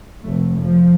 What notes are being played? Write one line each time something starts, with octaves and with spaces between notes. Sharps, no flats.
F1 A3
F3